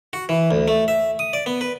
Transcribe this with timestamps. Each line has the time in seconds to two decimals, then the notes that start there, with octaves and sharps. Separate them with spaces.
0.13 F#4
0.29 E3
0.51 D2
0.68 A3
0.88 E5
1.19 D#6
1.33 D5
1.46 B3
1.61 B4